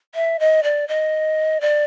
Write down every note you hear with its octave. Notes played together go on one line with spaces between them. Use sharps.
E5
D#5
D5
D#5
D5